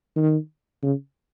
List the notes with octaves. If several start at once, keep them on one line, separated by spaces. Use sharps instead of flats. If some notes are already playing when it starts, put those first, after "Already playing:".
D#3
C#3